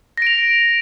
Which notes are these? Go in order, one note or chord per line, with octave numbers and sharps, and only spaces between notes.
A#6 D7 F7